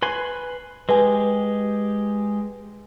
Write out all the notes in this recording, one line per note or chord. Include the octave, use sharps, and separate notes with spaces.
B4 G#5 C6
G#3 G4 B4 G#5